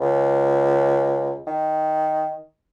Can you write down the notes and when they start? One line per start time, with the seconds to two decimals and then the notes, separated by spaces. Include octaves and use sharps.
0.01 C#2
1.47 D#3